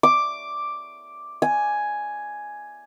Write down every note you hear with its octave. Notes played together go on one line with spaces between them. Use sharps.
D6
G#5